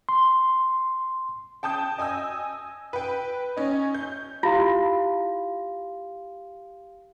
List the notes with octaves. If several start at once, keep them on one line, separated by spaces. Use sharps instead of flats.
C6
G5 A5 D#6 G6
D#5 G#5 D#6 E6
B4 G5
C#4 D#4
G6
E4 F4 G4 F5 C6